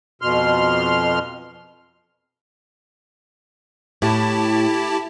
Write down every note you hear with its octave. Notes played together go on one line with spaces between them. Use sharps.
F2 B2 C6 F6
A2 E4 G4 A5